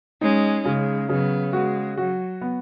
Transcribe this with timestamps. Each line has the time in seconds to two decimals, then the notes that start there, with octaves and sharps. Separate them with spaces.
0.21 G#3 C#4 D#4
0.65 C#3 G#3
1.09 C#3 F#3 B3
1.53 G#3 F#4
1.97 F#3 F#4
2.41 B3